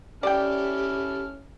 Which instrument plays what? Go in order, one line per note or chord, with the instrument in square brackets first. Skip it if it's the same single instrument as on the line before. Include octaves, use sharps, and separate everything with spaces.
[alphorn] C#4 [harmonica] E4 A4 F6 [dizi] G4 [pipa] D5 G5